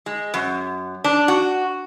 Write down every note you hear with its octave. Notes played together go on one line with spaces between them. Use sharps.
G#3
F#2
D4
F#4